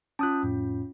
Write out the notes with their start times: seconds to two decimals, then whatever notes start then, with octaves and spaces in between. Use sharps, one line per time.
0.19 C#4 F4 A5 D#6 F#6
0.43 F2 A2